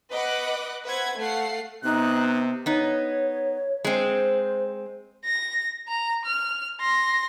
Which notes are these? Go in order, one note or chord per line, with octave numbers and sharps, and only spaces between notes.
B4 D#5 F#5 D6 F#6
B4 C5 E5 F#5 G#6
A3 F5 F#5 C7
C3 B3 D#4 F#6
B3 D#4 C#5
G#3 C4 C5
A#6
A#5
F6
C6 A#6